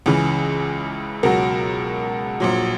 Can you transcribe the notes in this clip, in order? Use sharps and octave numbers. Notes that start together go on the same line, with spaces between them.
C#2 C#3 E3 G#4
C#2 B2 F#3 A#4
A#1 A#2 F#3